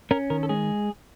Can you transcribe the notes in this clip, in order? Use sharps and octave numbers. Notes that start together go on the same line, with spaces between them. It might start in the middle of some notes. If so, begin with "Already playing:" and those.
C#4 A#4
D#3 A#4
A4
G#3 G#4